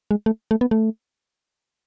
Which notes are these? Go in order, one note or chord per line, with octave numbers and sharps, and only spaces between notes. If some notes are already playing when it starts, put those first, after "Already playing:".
G#3
A3
A3
B3
A3